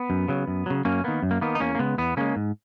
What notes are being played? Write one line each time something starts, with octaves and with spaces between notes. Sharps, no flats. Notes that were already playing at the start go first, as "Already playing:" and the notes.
Already playing: B3
F#2
C#3 F#3
F#2
C#3 F#3
F#2 A#3 C#4
D#3 A#3 B3
F#2
A#3
D#3 A#3 B3
D#4
E2 A#3 C#4
A#3
C#3 G#3 B3
E2 B3
C#3 G#3 A#3 C#4
G#2